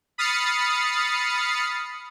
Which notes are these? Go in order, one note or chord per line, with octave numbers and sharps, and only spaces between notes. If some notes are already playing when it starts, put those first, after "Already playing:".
B5 D#6 F6 A6 C7 C#7